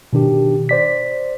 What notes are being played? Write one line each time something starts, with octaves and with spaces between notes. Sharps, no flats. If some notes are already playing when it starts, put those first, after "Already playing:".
B2 D#3 D4 G4
C5 D5 B6